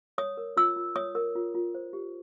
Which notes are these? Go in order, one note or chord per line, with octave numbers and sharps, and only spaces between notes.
C#5 D#6
A#4
F4 E6
F4
C#5 D#6
A#4
F4
F4
C5
G4